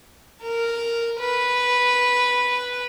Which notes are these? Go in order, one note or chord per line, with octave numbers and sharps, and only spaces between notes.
A#4
B4